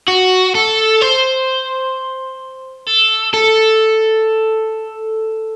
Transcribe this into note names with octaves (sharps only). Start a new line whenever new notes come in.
F#4
A4
C5
A4
A4